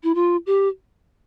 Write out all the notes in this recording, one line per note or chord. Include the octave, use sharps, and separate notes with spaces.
E4
F4
G4